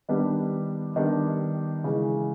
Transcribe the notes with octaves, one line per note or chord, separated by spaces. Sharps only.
D#3 G3 B3 D4
D#3 G3 B3 D4
C#3 E3 G#3